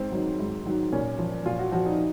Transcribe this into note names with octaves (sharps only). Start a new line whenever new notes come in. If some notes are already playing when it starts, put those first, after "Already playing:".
Already playing: G#2 C4
D#3 F#3
G#2
D#3 F#3
A#2 C#4
F3
A#2 F4
F#4
F3 F#4
D#4